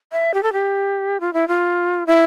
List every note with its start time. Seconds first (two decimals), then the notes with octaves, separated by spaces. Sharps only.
0.12 E5
0.34 G4
0.43 A4
0.53 G4
1.20 F4
1.33 E4
1.48 F4
2.07 E4